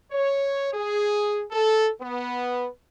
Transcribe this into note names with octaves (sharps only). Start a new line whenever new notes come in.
C#5
G#4
A4
B3